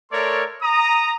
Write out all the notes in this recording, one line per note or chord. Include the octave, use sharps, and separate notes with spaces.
A3 A4 A#4 C#5 D5 C6
A#5 D#6